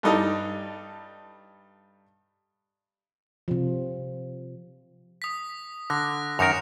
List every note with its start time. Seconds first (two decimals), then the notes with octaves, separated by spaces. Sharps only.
0.03 G2 G3 D#4 A4
3.48 C3 F3
5.22 D#6 B6
5.90 D3 F#6 A#6
6.39 F#2 D#3 A#4 D6 C#7 F7